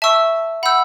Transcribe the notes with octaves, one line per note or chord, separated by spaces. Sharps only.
E5 A5 C#6 E6
F#5 B5 E6 G6